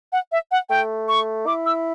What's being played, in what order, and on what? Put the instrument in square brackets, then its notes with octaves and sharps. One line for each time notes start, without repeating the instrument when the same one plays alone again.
[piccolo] F#5
E5
F#5
[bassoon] A3 [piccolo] G5
[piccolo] C#6
[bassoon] E4 [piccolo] D6
[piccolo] E6